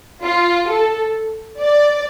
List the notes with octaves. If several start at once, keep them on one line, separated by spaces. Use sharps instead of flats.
F4
A4
D5